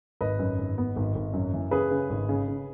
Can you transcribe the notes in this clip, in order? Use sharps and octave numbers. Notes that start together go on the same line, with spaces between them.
G#1 B4 D#5
F#2
G#1
B3
G#1
G#1
F#2
E3
C#3 G#4 B4
C#3
G#1
C#3
C#3